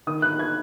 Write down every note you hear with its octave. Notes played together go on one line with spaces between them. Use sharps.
D#3 D#6
F#6
G#6